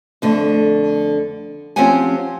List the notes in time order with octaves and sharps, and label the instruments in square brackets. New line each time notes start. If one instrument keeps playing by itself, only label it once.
[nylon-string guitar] F2 D3 A3
F3 C4 C#4 G4 F#5 G#5